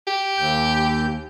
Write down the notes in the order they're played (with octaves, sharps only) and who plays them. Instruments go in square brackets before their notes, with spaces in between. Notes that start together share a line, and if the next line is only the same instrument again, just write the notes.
[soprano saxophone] G4
[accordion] D#2 G6